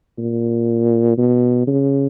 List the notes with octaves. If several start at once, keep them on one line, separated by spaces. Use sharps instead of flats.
A#2
B2
C#3